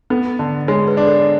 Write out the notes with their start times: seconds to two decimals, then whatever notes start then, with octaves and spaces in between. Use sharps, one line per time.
0.10 B3 A4
0.39 D3
0.67 G#3 C#5
0.88 B4
0.97 D4
1.07 A4